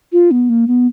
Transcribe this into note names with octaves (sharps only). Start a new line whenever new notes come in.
F4
B3
A#3
B3